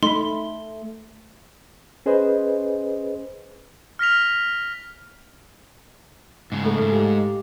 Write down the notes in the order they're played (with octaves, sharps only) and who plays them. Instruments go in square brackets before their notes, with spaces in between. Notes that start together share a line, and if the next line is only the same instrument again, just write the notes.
[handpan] A3 [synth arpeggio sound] D#4 B5 [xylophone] C6
[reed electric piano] C#4 G#4 B4 C5 D#5
[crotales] F6 A#6 B6 F7
[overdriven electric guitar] G#2 C#3
[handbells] A3 A4
[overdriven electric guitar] D2 G#2
[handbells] G4 F5